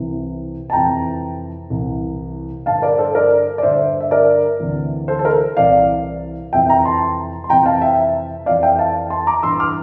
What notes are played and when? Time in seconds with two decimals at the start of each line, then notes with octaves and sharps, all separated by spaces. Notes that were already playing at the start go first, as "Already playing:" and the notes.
Already playing: C2 C3 E3
0.70 A5
0.73 F2 C3 E3 G5 A#5
1.70 C2 C3 E3
2.66 D3 F5 A5
2.70 G2
2.82 A#4 D5
2.98 A4 C5
3.15 A#4 D5
3.58 D5
3.63 G2 D3 C5 E5
4.01 E5
4.11 A#4 D5
4.60 D2 C3 E3
5.08 A4 C5
5.19 A4
5.25 A#4
5.57 C2 C3 E3 D5 F5
6.53 F2 C3 E3 E5 G5
6.69 G5 A#5
6.85 A5 C6
7.44 C6
7.49 F2 C3 E3 G5 A#5
7.66 F5 A5
7.82 E5 G5
8.46 F2 E3 D5 F5
8.63 E5 G5
8.79 F5 A5
9.10 A5 C6
9.27 A#5 D6
9.43 G2 E3 C6 E6
9.60 D6 F6